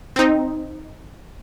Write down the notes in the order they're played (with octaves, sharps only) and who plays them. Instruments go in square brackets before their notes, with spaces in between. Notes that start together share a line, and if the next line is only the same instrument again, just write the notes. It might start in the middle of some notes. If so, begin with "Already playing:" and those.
[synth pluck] C4 D#4